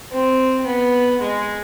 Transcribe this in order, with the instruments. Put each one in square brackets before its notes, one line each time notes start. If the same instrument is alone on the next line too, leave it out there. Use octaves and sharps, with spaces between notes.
[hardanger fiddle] C4
B3
G#3